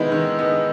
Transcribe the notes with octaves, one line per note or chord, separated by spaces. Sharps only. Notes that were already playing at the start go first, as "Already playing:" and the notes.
Already playing: D#3 G#3 B3 D#4 E4 D#5
D#3
G#3 B3 D#4